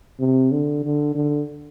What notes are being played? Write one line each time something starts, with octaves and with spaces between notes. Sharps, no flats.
C3
D3
D3
D3